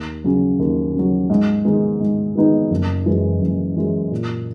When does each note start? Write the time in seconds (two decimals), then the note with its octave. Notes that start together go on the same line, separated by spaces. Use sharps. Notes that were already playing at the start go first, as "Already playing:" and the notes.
Already playing: D#2
0.24 C#3 F#3
0.59 D#2
0.94 C#3 F#3
1.30 G#2
1.65 D#3 G#3 B3 D#4
2.00 G#2
2.35 D#3 G#3 B3 D#4
2.71 F#1
3.06 F#2 E3 G#3
3.41 F#1
3.76 F#2 E3 G#3
4.11 A#2